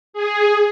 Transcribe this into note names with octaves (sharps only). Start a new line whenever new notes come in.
G#4